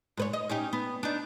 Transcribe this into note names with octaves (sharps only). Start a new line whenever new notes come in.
G#2 B4 C#5
D#5
C#4 D#4 G4
B3
D4 D#4